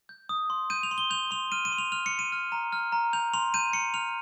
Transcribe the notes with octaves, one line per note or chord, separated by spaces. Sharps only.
G6
D#6
C6
G6 D#7
F7
C6
G7
G6 F7
C6 F7
F6 D#7
D#7
C6
F7
F6 F7
C#7
C6
D#7
F6
A#5
F6
A#5
G6 F7
C6 F7
G6 D#7
C6 C#7
F6 F7